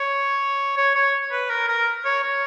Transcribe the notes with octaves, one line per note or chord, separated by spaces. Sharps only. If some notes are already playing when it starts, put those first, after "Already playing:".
Already playing: C#5
C#5
C#5
B4
A#4
A#4
C#5
C#5